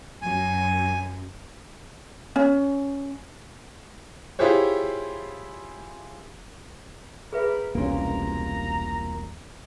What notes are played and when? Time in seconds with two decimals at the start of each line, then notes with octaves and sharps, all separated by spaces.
0.22 F#2 G#5
2.36 C#4
4.39 E4 F4 G4 G#4 C5 C#5
7.33 C4 G#4 A#4 B4 E5 B5
7.75 E1 C2 A#3 C#4 F4 A#5